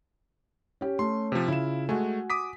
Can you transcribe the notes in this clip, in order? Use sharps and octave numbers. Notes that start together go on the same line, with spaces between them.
C#4 G4
A3 C#4 C6
C3 F3
C#3 E4 F4 E7
G#3 A3 F#4 G#5
D6 D#6 B6